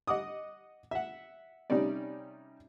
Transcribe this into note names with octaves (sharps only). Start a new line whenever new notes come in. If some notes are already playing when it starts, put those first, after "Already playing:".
D#5 F#5 D6 D#6
E5 F#5
C3 G3 C#4 D#4 D5